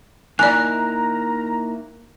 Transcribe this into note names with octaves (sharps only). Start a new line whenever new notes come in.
A#3 D#4 E4 D5 G#5 A#5 F#6